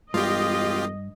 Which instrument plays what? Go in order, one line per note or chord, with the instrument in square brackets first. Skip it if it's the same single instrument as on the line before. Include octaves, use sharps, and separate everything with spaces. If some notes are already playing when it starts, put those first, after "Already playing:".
[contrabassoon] E1 [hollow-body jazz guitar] G2 [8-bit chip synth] F4 G4 [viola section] D#5